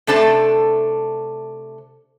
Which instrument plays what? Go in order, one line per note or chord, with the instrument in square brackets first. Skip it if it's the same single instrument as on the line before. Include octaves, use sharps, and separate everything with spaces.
[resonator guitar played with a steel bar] C3 A3 D4 A4 C5 A5